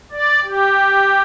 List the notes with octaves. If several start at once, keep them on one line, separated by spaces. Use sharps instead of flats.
D5
G4